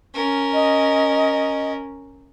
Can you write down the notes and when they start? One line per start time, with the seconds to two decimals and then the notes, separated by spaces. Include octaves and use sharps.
0.14 C#4 A#4
0.54 D#5